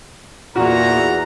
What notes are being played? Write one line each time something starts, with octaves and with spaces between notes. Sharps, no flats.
E2 A#2 F#4 A#5